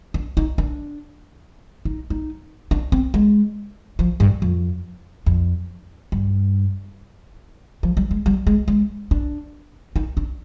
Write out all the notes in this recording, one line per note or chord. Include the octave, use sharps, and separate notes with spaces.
D4
D#4
D4
D#4
D#4
D4
C4
G#3
F3
G2
F2
F2
G2
F3
G3
G#3
G3
G#3
G#3
D4
D#4
D4